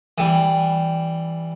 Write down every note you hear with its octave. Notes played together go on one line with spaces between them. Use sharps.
E3 G3